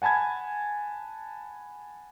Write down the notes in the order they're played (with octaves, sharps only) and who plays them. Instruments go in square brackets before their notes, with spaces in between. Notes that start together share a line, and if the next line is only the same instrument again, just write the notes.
[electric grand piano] F#5 G#5 A5 B5 G#6